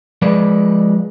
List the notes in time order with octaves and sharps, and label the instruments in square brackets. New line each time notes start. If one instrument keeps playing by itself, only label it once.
[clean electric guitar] F3 G#3 B4 D5